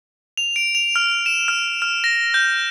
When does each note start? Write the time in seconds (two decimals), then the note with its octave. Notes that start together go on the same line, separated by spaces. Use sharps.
0.37 F7
0.56 D7
0.75 F7
0.96 F6
1.26 E7
1.48 F6
1.82 F6
2.04 A#6
2.34 G6